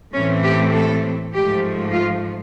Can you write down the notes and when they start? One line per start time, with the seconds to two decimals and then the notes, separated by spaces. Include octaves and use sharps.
0.13 A2 E3 A3 C4 C#4
0.43 G4
0.73 A4
1.33 G#2 F3 A3 G4
1.92 F4